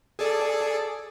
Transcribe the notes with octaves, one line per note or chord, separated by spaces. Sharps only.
G#4 A4 D5